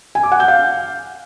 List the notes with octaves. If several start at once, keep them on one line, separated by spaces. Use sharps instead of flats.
G#5
D6
F#5
G6
F5